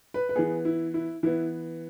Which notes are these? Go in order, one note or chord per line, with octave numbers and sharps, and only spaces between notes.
B4
B4
E3 B3 G#4
E4
E4
E3 B3 E4